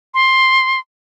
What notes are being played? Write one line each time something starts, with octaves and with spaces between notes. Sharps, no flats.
C6